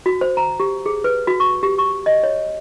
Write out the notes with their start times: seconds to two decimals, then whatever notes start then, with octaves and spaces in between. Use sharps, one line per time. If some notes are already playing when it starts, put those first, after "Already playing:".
0.06 F#4
0.21 C5
0.37 A#5
0.60 G4
0.86 G#4
1.04 B4
1.27 F#4
1.40 C#6
1.63 G4
1.78 C#6
2.06 D#5
2.23 C#5